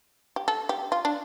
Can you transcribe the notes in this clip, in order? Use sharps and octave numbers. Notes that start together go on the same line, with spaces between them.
G4
A4
G4
F4
D4